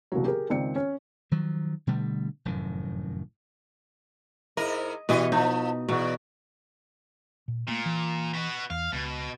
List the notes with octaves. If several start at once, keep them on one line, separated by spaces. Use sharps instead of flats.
C2 A#2 C#3 E3 F#3
G4 G#4 A#4
C#2 D#3 C4 D5 C#7
C#4
D#3 F3 F#3
B2 D3 G3 A3
F1 F#2 A2 D#3
G#2 E4 A#4 D#5
B2 E3 G3 D#5
F3 D#4
E2 B2 F#4
A#2
A#2 A3 A#3
E3
B3 F#4
E2 F5
C#2 B2